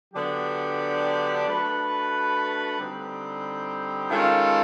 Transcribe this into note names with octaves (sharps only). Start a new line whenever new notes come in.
D3 F#3 B3 D4 G4
A3 D4 F#4 B4
D3 G3 C4 D#4 G4
D#3 G#3 C#4 F4 A4